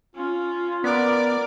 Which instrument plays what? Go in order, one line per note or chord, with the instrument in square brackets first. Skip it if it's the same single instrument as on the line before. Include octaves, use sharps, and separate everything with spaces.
[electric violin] C#4 [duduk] F4
[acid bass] B3 [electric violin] A#4 [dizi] D5